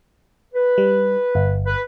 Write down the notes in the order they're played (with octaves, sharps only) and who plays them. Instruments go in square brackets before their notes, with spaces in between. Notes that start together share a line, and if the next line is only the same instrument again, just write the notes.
[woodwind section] B4
[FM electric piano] G3
G1
[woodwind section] B4